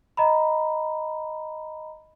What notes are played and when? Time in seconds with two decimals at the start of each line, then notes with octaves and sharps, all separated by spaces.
0.17 D#5 A#5 B5